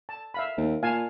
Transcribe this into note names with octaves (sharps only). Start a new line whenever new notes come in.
A5
E5 F5 B5
D#2
A#2 F5 G#5 A5